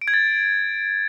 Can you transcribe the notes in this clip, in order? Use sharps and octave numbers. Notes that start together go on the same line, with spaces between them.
D7
G#6
A6